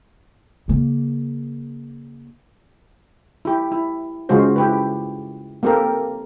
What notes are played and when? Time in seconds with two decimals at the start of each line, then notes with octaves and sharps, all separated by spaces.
0.68 C#3 A#3
3.45 E4 G4
3.72 E4
4.29 C#3 G#3 F4 F#4 C5
4.56 E4 G4 B4
5.63 A#3 C4 G4 A4 A#4